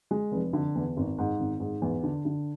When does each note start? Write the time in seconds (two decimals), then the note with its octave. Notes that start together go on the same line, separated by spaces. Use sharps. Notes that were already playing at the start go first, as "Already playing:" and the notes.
0.11 G#3
0.32 F1
0.53 D3
0.75 E2
0.97 G#1
1.18 G#2
1.40 G#1
1.60 G#2
1.82 E2
2.03 D3
2.25 D3